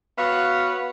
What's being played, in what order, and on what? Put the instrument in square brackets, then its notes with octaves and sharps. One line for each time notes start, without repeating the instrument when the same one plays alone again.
[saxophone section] B3 F#4 C#5 F5